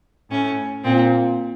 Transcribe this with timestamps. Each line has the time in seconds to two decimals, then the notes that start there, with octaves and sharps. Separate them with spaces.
0.31 A2 C#4
0.84 A#2 C4